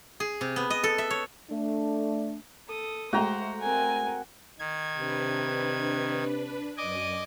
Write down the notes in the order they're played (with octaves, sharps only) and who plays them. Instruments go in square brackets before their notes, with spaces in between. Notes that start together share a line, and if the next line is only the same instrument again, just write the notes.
[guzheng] G#4
C3
B3
D#5
A4
E5
C#5
[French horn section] A3 D4
[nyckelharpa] A4 D#6
[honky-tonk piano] G#3 A3 [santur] F#4 G5 A#5 [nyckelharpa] C5
[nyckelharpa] C4 A#4 [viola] G#5
[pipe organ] D#3 G#6
[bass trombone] C3 [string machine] D4 B4
[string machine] F#2 D5 [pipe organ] D#5 G#5 D6